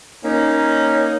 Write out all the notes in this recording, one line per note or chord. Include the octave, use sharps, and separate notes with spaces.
A#3 C#4 D#4